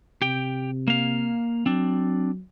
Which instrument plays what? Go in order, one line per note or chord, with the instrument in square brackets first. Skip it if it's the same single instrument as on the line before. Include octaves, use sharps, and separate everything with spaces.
[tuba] C3 [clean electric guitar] G4 G5
[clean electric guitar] A#3 F5
[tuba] F#3 [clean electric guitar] C4 D4